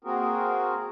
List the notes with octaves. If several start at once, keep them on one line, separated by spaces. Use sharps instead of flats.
A#3 C4 F#4 G#4 A#4